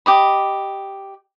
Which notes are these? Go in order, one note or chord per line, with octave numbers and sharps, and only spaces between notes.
G4 D#5 B5